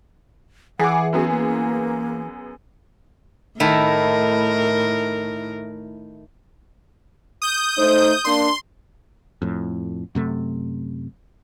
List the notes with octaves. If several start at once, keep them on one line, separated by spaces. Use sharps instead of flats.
E3 G#4 F#5 D6
F#2 B3 F#4 G#4
A#3
A2 D#3 A3 E4 A#4
D#6 G6
A3 D#4 C5
A#3 D4 C6
F2 A2
F#2 C3 A3